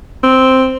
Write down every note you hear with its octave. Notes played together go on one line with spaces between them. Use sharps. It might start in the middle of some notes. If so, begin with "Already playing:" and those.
C4